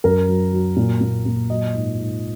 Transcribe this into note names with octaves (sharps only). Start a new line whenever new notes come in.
F#2 A#4
F#3
F#3
A#2
A#2
A#2
F#3 D#5
G#2
G#2